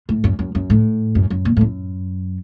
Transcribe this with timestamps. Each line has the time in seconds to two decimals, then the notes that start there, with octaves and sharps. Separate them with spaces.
0.09 A2
0.24 F#2
0.39 F#2
0.55 F#2
0.70 A2
1.15 F#2
1.30 F#2
1.45 A#2
1.57 A2
1.61 F#2